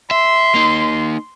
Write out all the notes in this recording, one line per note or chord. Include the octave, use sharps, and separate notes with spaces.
E5 C6
A#3 D#4